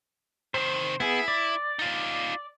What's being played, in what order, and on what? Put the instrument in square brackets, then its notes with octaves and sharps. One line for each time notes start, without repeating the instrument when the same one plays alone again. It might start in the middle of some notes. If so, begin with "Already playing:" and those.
[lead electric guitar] C3 D#3 [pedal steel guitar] C5
[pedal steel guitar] B3 G#4 [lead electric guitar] E4
[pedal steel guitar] D5
[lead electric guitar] D#4 F4